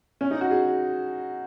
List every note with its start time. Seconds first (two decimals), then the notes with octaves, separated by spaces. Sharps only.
0.21 C#4
0.31 D#4
0.41 F#4
0.51 G#4